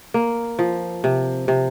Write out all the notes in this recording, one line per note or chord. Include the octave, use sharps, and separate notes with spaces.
A#3
F3
C3
C3